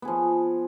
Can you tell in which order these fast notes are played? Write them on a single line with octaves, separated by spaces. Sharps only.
B3 G#4 F3